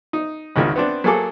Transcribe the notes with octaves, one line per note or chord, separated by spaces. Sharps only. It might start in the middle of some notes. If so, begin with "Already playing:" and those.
D#4
G#1 C#2 D#3
B3 C4 D4
F#3 A#3 G#4 A4 D6